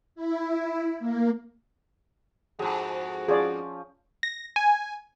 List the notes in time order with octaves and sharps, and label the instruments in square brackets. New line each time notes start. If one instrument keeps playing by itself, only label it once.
[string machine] E4
A#3
[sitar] F2 G#2 [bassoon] F#4 [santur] G#4
[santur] F3 C#4 [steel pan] G#4 D5
[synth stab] A#6
G#5